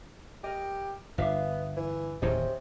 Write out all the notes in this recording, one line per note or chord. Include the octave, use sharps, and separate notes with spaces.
G4 A#4 D#5
G1 B3 D4 E5 F5
E3
D1 D#2 A2 C3 C#4 D#5